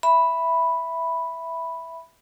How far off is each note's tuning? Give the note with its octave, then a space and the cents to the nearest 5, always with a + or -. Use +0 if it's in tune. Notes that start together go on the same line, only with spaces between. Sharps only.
E5 +0 B5 +0